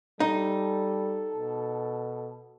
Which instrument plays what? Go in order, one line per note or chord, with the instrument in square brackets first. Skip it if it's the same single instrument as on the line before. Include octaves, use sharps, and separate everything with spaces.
[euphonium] G3 [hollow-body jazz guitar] D#4 [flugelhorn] A4
[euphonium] B2